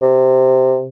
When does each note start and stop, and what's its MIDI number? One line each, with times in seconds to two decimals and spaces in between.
0.02 0.86 48